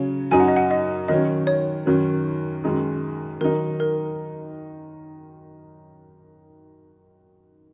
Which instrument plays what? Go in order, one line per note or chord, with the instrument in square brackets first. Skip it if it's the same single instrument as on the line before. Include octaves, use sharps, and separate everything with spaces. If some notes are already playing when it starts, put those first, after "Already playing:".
Already playing: [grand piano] C#3 F#3 C#4
[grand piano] F#2 F#3 D#4 [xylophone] G#5
[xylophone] F#5
D#5
F#5
D#5
[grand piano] D#3 F#3 C#4 [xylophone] D#5
[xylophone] C#5
[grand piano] F#2 D#3 F#3 C#4
F#2 D#3 G#3 D#4
[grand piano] D#3 F#3 D#4 [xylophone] A#4
[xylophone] A#4